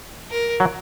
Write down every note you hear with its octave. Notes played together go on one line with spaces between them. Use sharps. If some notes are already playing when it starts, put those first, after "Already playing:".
A#4
F#3